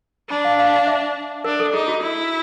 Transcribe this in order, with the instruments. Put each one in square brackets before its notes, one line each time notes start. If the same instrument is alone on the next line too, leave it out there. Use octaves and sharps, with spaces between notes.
[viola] D4 [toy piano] A#5
[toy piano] F5
F5
F5
E5
[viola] D4 [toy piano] A#4
[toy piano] A4
[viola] D#4 [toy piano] G#4
[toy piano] F#4
[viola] E4